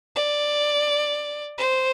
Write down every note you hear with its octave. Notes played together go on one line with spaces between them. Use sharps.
D5
C5